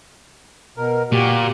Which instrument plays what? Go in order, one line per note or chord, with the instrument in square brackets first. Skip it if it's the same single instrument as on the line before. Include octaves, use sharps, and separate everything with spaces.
[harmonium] B2 A#4
[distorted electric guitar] A#2 [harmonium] F#4 G4